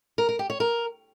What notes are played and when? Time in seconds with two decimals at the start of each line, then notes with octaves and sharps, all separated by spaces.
0.18 A#4
0.29 A#4
0.39 G4
0.50 C#5
0.60 A#4